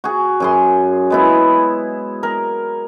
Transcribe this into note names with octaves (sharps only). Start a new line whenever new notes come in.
F#4 G#4
F#2 G#4 C6
G#3 B3 E4
A#4